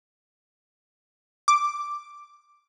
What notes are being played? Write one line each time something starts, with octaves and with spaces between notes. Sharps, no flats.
D6